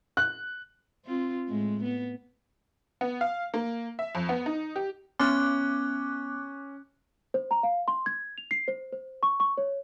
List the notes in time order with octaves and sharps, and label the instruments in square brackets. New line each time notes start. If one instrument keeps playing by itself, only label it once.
[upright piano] F#6
[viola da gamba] C4 F4
A2 G#3
B3
[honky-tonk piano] B3
F5
A#3
E5
F2
B3
D#4
G4
[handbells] B3 [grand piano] C#4 [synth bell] D6 F#6
[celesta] C5
A#5
F5
C6
G#6
F7
C7
C5
C5
C#6
C#6
C#5